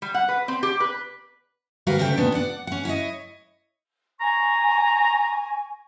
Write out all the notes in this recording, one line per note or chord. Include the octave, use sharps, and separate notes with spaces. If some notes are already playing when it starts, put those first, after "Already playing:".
G3
F#5
B4
C4
G4
B4
D2 G3 F#4 A#4 B4 F5
D2 C#3 A3 B4 G5
D#2 A#2 B3 D4
D5 F#5
C#4 F#5
E4 C#5 D#5
G#5 A#5 C#6